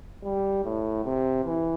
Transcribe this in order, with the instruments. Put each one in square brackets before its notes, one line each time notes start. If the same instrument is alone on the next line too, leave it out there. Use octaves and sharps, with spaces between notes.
[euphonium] G3
A2
C3
E3